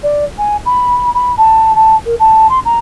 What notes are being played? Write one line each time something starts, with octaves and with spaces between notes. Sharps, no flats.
D5
G#5
B5
B5
A5
A5
A#4
A5
C6
A#5